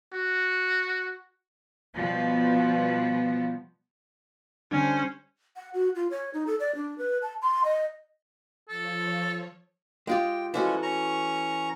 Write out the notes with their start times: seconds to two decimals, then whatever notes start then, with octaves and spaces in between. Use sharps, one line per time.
0.14 F#4
1.94 B2 F3 G3 B3
4.72 D3 G3 C#4 D4 C5
5.56 F#5
5.74 F#4
5.95 F4
6.11 C#5
6.34 D#4
6.47 A4
6.60 D5
6.75 D4
6.98 B4
7.22 A5
7.42 C6
7.64 D#5
8.68 F3 A4 C#5
10.07 G#3 F4 G4 G5
10.54 E3 F3 G#3 A3 C#4 F#4
10.82 C#4 A#5 C#6